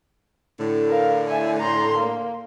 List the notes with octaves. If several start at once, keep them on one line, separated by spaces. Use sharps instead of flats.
A2 D3
A#4 F5
E5 G#5
A#5 C6
A#3